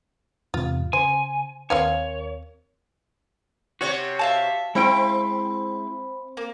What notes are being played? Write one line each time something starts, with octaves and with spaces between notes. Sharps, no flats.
E2 G#2 C3 F4
C#3 C5 G#5
D#2 C4 A#4 C#5 F5 G#5
C3 F#4 C#5
E5 F5 A5
G#3 C4 E4 C5 G5 B5
A#3